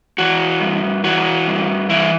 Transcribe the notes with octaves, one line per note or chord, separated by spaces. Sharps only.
E3 F#4
G2
E3 F#4
G2
E3 E4